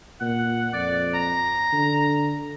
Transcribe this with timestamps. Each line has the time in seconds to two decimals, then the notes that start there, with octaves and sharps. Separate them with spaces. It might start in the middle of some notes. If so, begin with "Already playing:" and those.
0.21 A#2 F#5
0.73 F2 D5
1.14 A#5
1.73 D3